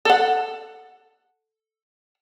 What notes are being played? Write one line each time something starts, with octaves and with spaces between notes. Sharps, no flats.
A4 F#5